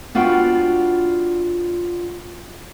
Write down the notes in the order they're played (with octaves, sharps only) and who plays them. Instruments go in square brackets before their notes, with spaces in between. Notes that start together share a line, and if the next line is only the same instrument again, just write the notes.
[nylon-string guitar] B3 D4 F4 F#4 F5 G5